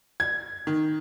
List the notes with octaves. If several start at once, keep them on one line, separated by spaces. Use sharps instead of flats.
G#6
D#3